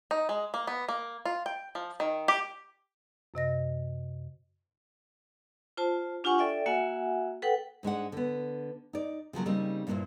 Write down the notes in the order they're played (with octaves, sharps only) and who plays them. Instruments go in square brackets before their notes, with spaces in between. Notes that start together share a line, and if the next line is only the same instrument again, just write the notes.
[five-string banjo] D#4
G#3
A#3
B3
A#3
F4
G5
F3
D#3
G4
[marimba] F#2 C3 D#5 A#6
[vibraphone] F4 C5 A5
D4 F4 G4 F#5 G#5 C#6
A4 D5 E5 G5
A#3 F#4 E5 F#5 G#5
A4 B4 F#5 G5
[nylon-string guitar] G#2 G#3 D4 F#5
D3 B3
D#4 D5
C#3 F3 F#3 A#3
C#3 G3 A#3 C4 D#4
G2 A#2 A#3 D4 E4 C5